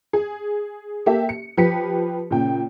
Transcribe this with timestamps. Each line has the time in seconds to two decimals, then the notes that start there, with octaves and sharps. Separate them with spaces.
0.13 G#4
1.06 A#3 G4 A4 E5
1.29 C#7
1.57 F3 G4 B4 B6 C#7
2.31 A#2 C#3 G5